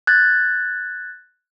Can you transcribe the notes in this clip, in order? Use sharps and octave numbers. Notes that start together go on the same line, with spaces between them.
F#6 G#6 A6